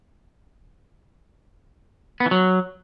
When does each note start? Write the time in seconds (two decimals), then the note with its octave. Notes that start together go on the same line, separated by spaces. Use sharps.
2.20 B3
2.26 E3
2.31 F#3